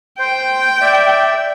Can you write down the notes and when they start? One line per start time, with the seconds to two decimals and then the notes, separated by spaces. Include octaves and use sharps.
0.19 C5 G5
0.81 D5 E5